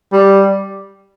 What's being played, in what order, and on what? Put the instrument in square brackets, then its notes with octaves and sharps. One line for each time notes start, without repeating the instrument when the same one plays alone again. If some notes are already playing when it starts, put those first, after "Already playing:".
[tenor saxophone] G3